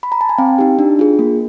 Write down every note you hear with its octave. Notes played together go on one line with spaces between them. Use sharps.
B5
A#5
A5
G#5
C4 F5 G5
D#4 G4
D4
F4 G#4
A#3